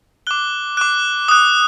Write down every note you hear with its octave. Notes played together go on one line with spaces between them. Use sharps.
D6 F#6 G7
D6 F#6
D#6 F#6